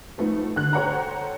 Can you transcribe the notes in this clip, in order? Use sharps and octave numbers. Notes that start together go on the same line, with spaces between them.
F3 A3 B3 D#4
D3 F#6
A4 C5 C#5 F#5 G5 A#5